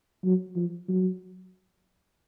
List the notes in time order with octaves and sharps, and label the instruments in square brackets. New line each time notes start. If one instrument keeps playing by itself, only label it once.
[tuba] F#3
F3
F#3